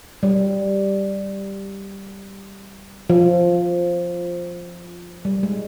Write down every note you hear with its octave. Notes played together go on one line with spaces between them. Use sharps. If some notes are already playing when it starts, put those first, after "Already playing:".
G3
F3
G3
G#3